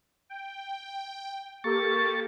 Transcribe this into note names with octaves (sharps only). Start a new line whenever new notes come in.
G5
A#3 G4 A4 C#6 A6